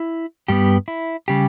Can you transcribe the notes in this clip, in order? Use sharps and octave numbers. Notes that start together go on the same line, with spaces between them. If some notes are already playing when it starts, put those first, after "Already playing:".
Already playing: E4
G2 G3 B3 G4
E4
C#3 G3 G4